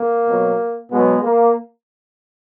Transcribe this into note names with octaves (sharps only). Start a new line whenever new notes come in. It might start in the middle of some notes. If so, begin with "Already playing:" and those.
Already playing: A#3
B2 F#3
B2 F#3 G#3 B3
A#3